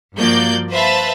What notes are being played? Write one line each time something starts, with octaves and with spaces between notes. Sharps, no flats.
G2 F3 A#3 F#4 D5 G6
B4 C5 E5 F5 A5 B5